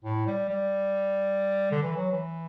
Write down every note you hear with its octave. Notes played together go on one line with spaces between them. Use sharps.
A2
G3
G3
D3
E3
F#3
E3